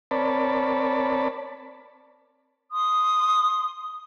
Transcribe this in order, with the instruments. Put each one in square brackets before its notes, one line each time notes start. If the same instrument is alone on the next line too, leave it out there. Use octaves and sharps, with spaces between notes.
[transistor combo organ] C4 A#4 C#5 D5 A5 B5
[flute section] C6 D#6